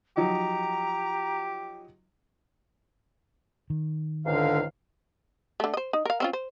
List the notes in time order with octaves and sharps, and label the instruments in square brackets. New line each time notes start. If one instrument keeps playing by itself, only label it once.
[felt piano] F3 F#3 D#4 [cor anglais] G4 [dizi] A#5
[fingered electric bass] D#3
[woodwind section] C#2 G#2 F5 [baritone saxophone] D3
[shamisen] D3 A3
C5 D#5
D#4
A#4 F5
C4 C#4 F4
C5